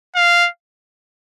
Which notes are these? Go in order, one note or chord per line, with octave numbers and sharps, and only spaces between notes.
F5